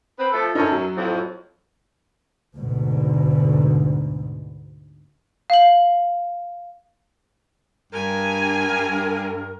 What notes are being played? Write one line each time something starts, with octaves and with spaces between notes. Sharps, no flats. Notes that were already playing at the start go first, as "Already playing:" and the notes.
C4 B4
F3 A3 A4
F#2 C#4 D#4 A4
F#3
F2 A2
D2 G#2 B2
F5 F#7
G2 A#4 G#5